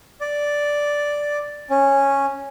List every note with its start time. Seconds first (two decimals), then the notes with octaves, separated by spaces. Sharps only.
0.21 D5
1.70 C#4